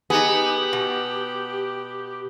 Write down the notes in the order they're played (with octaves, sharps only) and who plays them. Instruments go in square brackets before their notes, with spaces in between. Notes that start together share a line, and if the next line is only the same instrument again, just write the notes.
[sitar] B3 [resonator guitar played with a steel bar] D#4 G#4 [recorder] G4
[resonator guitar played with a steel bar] B2